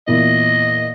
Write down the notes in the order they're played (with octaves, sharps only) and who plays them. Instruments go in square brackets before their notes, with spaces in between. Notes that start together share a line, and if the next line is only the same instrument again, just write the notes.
[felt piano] E2 A#2 E3 [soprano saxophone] D#5